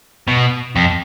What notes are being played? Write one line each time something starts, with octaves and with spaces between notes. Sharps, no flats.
B2
F2